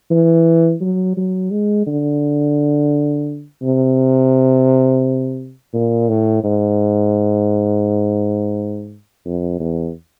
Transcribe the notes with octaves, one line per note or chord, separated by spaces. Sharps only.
E3
F#3
F#3
G#3
D3
C3
A#2
A2
G#2
F2
E2